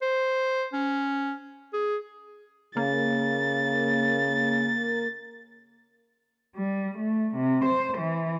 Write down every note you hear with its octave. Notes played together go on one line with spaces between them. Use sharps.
C5
C#4
G#4
C#3 A#3 A6
G3
A3
C3
C5
E3